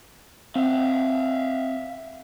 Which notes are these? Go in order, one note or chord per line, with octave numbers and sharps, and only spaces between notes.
C4 E5 F5